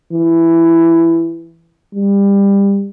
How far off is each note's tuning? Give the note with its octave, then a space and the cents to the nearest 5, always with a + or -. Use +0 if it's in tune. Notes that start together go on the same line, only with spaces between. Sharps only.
E3 +10
G3 +25